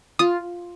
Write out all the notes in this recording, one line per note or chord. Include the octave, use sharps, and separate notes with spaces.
F4 D#6